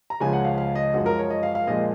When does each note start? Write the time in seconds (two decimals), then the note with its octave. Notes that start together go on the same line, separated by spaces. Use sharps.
0.10 A#5
0.20 C#2 C#3 F3 G#3 G#5
0.33 F#5
0.45 F5
0.58 F5
0.75 D#5
0.94 F#2 F3 G#3 F#4
1.06 A#4
1.19 C#5
1.30 D#5
1.43 F5
1.55 F5
1.67 A#2 F3 G#3 D#5